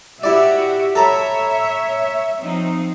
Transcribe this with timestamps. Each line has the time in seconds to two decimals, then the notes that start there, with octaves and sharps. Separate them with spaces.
0.23 E4 F#4 G4 D5 E5
0.95 A4 C#5 E5 A#5 B5
2.41 F3 C4 D#4